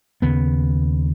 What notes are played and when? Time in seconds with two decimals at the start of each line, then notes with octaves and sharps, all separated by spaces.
0.22 D#2 C#3 B3